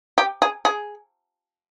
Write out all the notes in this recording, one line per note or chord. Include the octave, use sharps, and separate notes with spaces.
G4
G#4
G#4